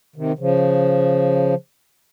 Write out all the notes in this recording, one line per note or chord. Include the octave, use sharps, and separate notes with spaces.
C3 D#3
C#3 F3